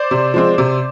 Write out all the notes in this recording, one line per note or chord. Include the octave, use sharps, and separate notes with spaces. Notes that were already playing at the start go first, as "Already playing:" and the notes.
Already playing: C5 D5
C3
F3 G#3 C4
C3